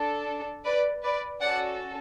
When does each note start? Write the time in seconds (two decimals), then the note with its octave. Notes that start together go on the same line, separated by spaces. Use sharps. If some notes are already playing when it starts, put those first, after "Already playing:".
Already playing: D4 A4
0.64 B4 D5
1.03 B4 D5
1.41 C#4 F#4 A4 D5 F#5